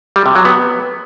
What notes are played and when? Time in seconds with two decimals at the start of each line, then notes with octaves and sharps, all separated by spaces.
0.16 G3
0.26 C3
0.35 F#3
0.45 B3